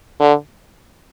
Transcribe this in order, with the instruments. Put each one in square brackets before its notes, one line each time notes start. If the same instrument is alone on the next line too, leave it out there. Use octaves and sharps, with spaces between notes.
[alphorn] D3